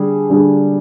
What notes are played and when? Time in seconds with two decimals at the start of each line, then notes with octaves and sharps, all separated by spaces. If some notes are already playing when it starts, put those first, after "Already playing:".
Already playing: D3 G3 D4 G#4
0.30 D3 G3 D4 G#4